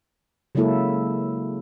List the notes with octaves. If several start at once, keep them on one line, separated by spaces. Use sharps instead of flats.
C#3 F#3 G#3 A#3 E4 A4